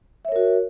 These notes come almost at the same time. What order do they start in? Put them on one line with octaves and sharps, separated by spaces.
E5 C#5 A#4 F#4